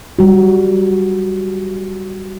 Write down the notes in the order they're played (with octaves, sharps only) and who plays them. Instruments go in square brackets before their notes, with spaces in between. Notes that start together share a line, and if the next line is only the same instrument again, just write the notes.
[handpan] G3 F#4